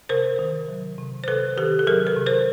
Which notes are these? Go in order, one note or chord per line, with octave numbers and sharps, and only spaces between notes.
C3 A#4 C5
D#3
F#3
C3
C5
C3 A4 B4
D#3 G4 A4
A4
F#3 G#4 A#4
A4 B4
C3
A#4 C5